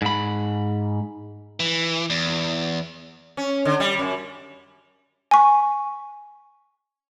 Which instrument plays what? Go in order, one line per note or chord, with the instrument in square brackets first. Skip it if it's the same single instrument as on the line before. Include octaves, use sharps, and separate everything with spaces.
[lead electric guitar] G#2 B5
E3
E2
[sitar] C#4
D3
G3
F#2
[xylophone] G#5 C#6